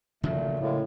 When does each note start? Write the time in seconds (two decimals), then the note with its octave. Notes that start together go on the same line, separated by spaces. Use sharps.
0.23 A#2 C#3 F3 F#3 A3
0.60 A2 G#3 A#3